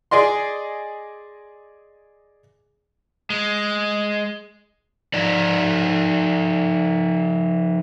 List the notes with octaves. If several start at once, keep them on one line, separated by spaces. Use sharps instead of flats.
G#4 D5 D#5 C6
G#3
F3 D#4 D5